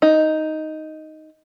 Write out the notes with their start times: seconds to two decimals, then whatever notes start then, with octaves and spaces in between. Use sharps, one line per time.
0.02 D#4